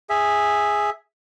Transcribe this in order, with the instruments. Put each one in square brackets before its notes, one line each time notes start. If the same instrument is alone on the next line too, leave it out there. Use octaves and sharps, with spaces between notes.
[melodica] G#4 E5